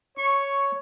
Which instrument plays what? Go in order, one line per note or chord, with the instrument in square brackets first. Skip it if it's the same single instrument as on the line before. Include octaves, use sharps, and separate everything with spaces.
[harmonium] C#5 [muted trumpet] C#6